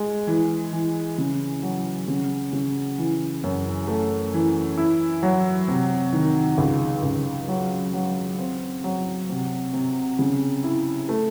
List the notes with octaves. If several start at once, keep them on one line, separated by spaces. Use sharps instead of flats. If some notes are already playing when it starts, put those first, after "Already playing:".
Already playing: G#3
E3
E3
C#3
F#3
C#3
C#3
E3
F#2
A3
E3
E4
F#3
C3
D#3
C#2
C#2
F#3
F#3
C4
F#3
C3
C3
C#3
E4
A3